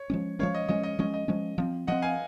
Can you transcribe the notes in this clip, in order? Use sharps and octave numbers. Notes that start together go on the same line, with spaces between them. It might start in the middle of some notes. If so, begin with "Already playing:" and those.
Already playing: C#5
F3 G#3 C#4
F3 G#3 C#4 C#5 F5
D#5
F3 G#3 C#4 D#5
D#5
F3 G#3 C#4 D#5
D#5
F3 G#3 C#4
F3 C4
F3 C4 D#5 F#5
F5 G#5